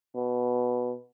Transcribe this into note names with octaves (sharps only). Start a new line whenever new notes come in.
B2